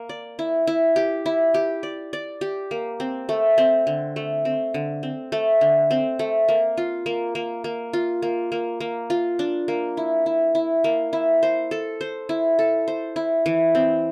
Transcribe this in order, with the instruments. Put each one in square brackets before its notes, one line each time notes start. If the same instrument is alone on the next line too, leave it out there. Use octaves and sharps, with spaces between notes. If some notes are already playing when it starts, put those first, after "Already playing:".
Already playing: [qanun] A#3
D5
E4
E4
G4
E4
G4
D5
D5
G4
A#3
C4
A3
C4
D3
A3
C4
D3
C4
A3
D3
C4
A3
A#3
F4
A#3
A#3
A#3
F4
A#3
A#3
A#3
F4
D4
A#3
E4
E4
E4
A#3
E4
C5
A4
C5
E4
A4
C5
E4
E3
C4